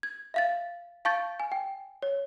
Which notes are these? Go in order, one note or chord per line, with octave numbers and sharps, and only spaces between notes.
G#6
E5 F5 A6
F5 A5 C#6 G6 A6
G#5
G5
C#5